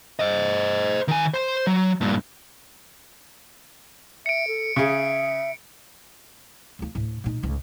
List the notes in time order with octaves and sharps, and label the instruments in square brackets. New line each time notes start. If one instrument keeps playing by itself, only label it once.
[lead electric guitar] C5 D#5
D#3 G#5
C5 C6
F#3
G2 A#2
[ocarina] E5 [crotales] C#7 D7
[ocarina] A4
[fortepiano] C#3 G#4 [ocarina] E5
[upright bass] D2 F4
D2 A2
A#2 D#4
C#2 G#2